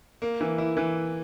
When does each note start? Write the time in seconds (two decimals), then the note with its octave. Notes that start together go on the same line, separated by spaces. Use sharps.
0.22 A#3
0.41 E3
0.58 E4
0.77 E3